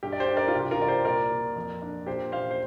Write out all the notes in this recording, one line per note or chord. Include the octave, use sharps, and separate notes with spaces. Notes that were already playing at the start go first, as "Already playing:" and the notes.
G2 G4
D5
G4 C5
D4
A#4 D5
F4
C2 G4
F4 A#4
C2 D5
G4 C5
A#2 A#4 D5
A#2
F2
D4
A#2 G4 C5
A#2 C5 F5
C5